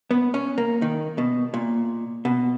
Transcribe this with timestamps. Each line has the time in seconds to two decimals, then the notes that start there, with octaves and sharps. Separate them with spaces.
0.11 B3
0.34 C#4
0.58 A#3
0.82 D#3
1.18 B2
1.54 A#2
2.25 B2